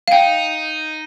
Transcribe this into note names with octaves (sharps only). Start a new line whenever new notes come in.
F5
D#4 G5